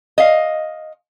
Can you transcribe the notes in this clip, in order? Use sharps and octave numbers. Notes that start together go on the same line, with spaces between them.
D#5 F5